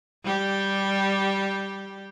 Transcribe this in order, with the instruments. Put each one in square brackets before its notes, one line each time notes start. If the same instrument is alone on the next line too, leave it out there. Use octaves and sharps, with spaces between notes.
[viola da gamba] G3 G4